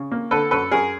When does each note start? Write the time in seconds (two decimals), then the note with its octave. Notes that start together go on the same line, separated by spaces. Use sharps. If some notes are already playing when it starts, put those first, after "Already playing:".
Already playing: C#3
0.12 A#3
0.31 D3 A4 B4
0.51 F#2 A4 B4
0.71 F#2 G#4 A#4